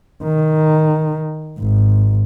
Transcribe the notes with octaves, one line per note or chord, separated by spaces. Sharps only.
D#3
G#1